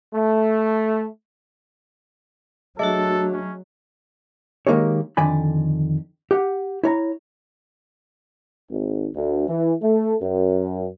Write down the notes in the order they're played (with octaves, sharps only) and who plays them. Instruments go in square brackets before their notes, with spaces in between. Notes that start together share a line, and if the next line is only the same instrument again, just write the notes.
[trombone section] A3
[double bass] F#3 [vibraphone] A3 D4 F#4 [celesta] G#4 D#5 E5 [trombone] A4
[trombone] C#4
[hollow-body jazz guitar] D#3 G#3 A#3 D#4 G4 C#5
F2 D3 D#3 D5 G#5 B5
G4 F#5
E4 C#5 A#5
[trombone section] G#1
D2
E3
A3
F#2